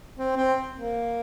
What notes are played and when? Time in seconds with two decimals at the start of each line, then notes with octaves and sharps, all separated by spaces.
0.17 C4
0.37 C4
0.75 A#3